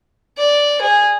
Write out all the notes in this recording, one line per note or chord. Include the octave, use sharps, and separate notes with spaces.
D5
G#4